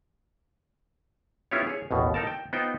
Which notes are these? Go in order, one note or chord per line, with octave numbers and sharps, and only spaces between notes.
B3 C#4 E4 F4 G4 C#5
G#4 C#5
A1 D#2 B2
D#4 A4 A#4 A5
G5
B3 D#4 F4 C5 G5